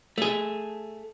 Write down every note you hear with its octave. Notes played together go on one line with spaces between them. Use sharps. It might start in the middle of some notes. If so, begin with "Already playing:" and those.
A3 G#4